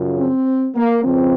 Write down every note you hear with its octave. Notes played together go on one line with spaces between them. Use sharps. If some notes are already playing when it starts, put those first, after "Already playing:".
Already playing: F#2 C#3 F3
C4
A#3
C#2 C#3 F3 C4